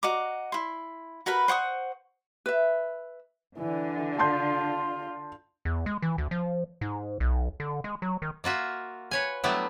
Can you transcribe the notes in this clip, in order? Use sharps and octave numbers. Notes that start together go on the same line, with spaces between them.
F#4 D#5 A#5 D6
E4 C6
F#4 A#4 B4 B5
C5 F#5 C#6 D#6
B4 E5
D3 E3
F4 A5 C6 G6
E2
G#3
E3
D2
F3
G#2
B1
D3
G#3
F#3
D#3
A#3 F4 F#4 E5
B4 C#5 G#5
F#3 G3 A3 B3 D4 E4